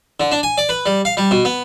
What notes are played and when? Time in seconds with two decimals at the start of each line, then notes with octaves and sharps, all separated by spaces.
0.20 D3
0.31 D4
0.43 G#5
0.58 D5
0.69 B4
0.86 G3
1.05 F5
1.17 G3
1.31 B2
1.45 B3